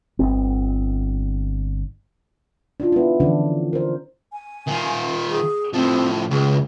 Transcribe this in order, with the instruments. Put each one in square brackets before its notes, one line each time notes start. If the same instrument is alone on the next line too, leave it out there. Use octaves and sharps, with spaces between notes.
[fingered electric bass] G1 C4
[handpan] D4 D#4 F4
B3 E4
D3 E3 F3 C#4 D4
A#4 C5
[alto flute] G#5
[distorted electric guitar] D#3 F4
[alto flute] G#4
[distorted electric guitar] A2 F3 [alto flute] C4
[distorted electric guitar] C#2 [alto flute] G#4